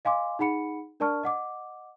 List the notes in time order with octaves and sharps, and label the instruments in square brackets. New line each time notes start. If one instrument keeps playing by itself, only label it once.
[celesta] D#5 F5 G#5 C6 D6
D#4 G#4 F#5 B5 C#7
D4 A#4 D5 A5 C#6 F6
D#5 F#5 D6